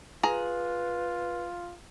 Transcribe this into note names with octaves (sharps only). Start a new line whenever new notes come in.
F4 G#4 B4 A#5